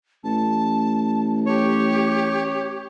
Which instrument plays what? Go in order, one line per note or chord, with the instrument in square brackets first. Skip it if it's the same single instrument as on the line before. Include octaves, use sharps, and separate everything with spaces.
[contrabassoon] A1 [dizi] A5
[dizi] G4 [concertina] C#5